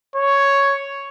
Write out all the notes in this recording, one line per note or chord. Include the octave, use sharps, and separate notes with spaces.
C#5